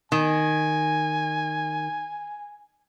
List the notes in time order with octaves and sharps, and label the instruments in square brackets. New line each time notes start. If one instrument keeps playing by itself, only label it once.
[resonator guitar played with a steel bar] D#3 [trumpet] G#5